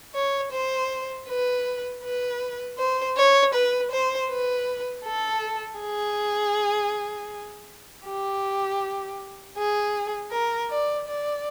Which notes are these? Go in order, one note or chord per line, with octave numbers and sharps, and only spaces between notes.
C#5
C5
B4
B4
C5
C#5
B4
C5
B4
A4
G#4
G4
G#4
A#4
D5
D5